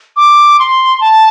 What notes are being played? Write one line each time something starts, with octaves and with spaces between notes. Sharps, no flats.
D6
C6
A5